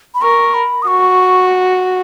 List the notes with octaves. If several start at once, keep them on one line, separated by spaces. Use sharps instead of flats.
B5
A#4 C#6
B5
D#6
F#4 C#6